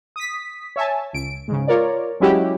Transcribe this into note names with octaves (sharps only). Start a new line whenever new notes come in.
D#6 B6
C#5 E5 G#5 A5
C#2 D7
G#2 C#3
F4 A#4 C#5 D5
F#3 G#3 C#4 E4 F#4 G4